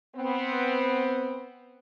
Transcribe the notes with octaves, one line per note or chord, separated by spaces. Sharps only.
B3 C4